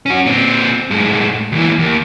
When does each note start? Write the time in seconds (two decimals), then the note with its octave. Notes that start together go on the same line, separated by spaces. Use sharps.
0.06 C#4 F#4
0.26 A#2 C4
0.91 A2 G#3
1.52 D#2 E3
1.79 D#2